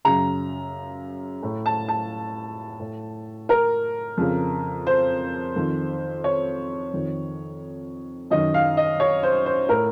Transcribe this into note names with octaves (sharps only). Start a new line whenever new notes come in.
F#2 C#3 A#5
A2
A5
A5
A2
A#4
F2 C#3
C5
F2 D#3
C#5
F2 D#3
F#2 D#3 D#5
F5
D#5
C#5
C5
C5
A2 A#4